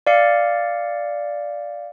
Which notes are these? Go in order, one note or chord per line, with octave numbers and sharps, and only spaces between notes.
D5 F5 C#7